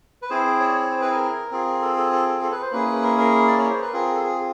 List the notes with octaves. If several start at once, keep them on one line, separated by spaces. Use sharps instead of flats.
B4
C4 E4 G#4 C5
C#5
D5
C#5
C5
B4
A#4
C4 F4 G#4
A4
A4
A4
A4
A4
B4
C5
A#3 C#4 E4 G#4 B4
A#4
A#4
D5
C#5
C5
B4
C4 F4 G#4 A#4
A4
G#4